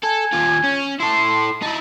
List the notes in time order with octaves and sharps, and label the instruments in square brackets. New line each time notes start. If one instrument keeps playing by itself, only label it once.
[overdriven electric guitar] A4 [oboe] G#5
[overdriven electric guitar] D#2 F4
C#4
[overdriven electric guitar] E4 A4 [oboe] C6
[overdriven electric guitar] D#4 E4 [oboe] A5